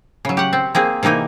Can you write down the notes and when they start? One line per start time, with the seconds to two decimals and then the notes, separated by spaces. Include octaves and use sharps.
0.25 C#3 F#3
0.37 G4 F#5
0.53 C4
0.75 A#3 C4 G#4
1.03 C3 E3 A#3 D#4 G#5